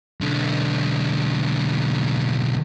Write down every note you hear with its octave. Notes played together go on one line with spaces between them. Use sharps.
B1 D3